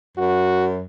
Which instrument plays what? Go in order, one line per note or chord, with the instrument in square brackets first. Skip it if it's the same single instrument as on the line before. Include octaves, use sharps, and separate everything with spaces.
[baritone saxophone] F#2 [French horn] F#4